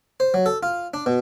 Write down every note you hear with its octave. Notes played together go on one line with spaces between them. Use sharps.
C5
F#3
A4
F4
D4
B2